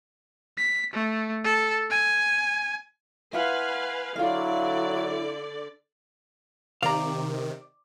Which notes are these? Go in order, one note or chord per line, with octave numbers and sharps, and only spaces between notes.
B6
A3
A4
G#5
E4 F4 B4 F5 F#5 G#5
D3 F#3 E4 F4 D5 F5
C3 D#3 D5 F5 A#5